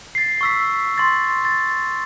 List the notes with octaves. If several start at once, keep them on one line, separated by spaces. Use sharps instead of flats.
A6 C7
C#6 E6 B6
C6 A6
A6